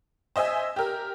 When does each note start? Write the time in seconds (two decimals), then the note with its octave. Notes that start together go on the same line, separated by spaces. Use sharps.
0.36 C5 D#5 E5 G#5
0.76 G4 A#4